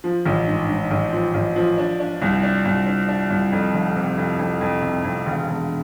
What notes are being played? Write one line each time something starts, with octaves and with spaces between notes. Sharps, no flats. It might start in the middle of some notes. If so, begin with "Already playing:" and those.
F3
A1
G#2
G#2
A1
F3
A1
F3
D4
D4
C2
D4
C2
D4
D4
C2
F2
F1
C3
F2
F2
F2
C3
F2
E1
E1